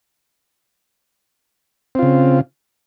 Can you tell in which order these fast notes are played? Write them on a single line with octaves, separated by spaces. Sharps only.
C4 F4 C#3